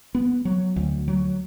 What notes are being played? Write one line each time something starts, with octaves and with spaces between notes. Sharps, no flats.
B3
F#3
D2
F#3